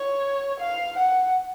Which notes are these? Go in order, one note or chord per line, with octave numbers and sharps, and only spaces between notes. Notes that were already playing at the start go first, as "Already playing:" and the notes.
Already playing: C#5
F5
F#5